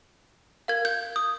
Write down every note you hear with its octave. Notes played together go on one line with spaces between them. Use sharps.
A#4 F5 G#6
G6
D#6